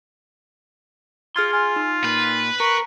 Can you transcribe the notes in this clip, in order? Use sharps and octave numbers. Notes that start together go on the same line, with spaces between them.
F4 G#4 C6 F6 G#6
F4 G#5
D#4
A#2 B4
A#4 A#5 C#6